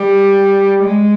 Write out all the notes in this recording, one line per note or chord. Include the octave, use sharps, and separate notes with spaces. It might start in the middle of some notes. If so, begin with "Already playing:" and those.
Already playing: G3
G#3